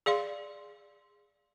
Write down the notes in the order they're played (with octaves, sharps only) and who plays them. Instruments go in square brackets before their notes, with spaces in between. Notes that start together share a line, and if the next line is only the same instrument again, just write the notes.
[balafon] G#4 D5 F5 C6